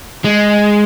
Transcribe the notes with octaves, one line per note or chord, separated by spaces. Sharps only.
G#3